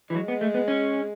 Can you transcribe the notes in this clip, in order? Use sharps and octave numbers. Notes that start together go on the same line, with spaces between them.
E3
F#3 G#3
B3
A3
B3
C#4